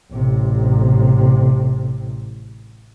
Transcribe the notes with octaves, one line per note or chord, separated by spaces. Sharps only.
A1 C3